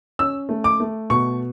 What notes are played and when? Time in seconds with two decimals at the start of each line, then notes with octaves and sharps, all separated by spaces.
0.19 C#4 E6
0.49 A3
0.64 D6
0.80 A3
1.10 B2 C#6